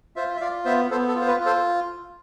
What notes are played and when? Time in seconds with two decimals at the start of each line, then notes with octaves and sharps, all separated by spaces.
0.16 F4 C5 E5
0.36 E5
0.41 F4 D5 F5
0.65 B3 C5 E5
0.91 B3 A4 C5
1.08 A4
1.16 F4
1.21 C5
1.28 B4
1.40 F4
1.46 A4 C5